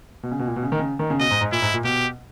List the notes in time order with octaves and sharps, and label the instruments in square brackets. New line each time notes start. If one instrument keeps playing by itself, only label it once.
[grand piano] B2
C#3
B2
A#2
B2
C#3
D#3
C#3
D#3
C#3
[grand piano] B2 [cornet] D#5
[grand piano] G#2
G#2
[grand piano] A#2 [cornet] E4
[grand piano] G#2
A#2
[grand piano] B2 [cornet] G4